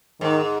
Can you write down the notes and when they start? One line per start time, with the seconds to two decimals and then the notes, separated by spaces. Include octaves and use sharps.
0.21 G#2 D#3